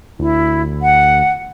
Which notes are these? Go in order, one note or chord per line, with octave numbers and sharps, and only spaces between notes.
D2 E4
F#5